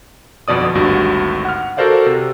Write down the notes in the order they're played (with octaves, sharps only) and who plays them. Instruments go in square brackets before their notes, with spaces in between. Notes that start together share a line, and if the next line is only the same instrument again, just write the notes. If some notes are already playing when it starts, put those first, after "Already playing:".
[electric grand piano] G1 F2 B2 D5 D#6
G#1 D2 G2 F#4
F#5 F6
F#4 A4 A#4 C5 D5 F5
C3